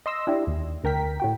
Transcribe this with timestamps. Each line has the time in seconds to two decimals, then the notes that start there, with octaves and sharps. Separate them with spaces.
0.06 D#5 C6 E6 A#6
0.27 D4 E4 G4
0.47 D#2
0.84 D2 A#4 G5 B6
1.20 A2 F#4 G5